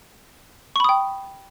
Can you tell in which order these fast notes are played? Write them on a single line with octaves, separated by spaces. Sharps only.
C#6 B5 D#6 G5